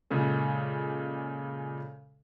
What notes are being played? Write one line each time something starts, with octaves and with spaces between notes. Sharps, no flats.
A#2 C#3 G#3 C#4 A4